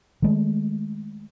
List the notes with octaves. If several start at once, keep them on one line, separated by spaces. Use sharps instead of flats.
D#3 G#3 A3